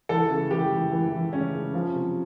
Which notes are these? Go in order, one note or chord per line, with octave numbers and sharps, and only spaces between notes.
E3 A4
C#3
E3 G4
E3
E3
E3
C#3 C#4
C#3
F3
C3